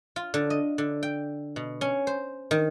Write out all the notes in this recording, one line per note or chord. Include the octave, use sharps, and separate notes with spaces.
F4
D3
D#5
D3
G5
B2
C#4
C5
D#3